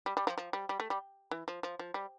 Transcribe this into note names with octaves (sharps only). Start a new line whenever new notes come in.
G3
G3
F3
F3
G3
G3
A3
G3
E3
F3
F3
F3
G3